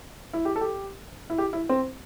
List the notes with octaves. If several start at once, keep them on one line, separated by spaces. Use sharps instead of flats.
E4
G4
A4
G4
E4
G4
E4
C4